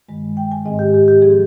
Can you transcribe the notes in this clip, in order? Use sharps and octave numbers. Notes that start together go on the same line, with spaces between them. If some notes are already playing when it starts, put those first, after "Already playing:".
G2 D#3 G#3
G5
G#5
G#2 D#3 G#3 C4 D#5
G4
G4
G4
F3 C4 G#4